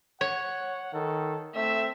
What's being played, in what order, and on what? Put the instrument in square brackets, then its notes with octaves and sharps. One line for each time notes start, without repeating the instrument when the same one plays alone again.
[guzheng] C#5 [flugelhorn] F#5
[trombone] D#3 [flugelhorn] A4
[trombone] A3 [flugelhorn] C4 [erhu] E5